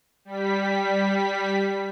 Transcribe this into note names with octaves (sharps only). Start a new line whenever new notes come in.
G3 B6